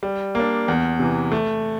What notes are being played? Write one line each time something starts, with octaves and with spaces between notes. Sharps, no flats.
G3
A#3 D4
E2
C3 E3
A3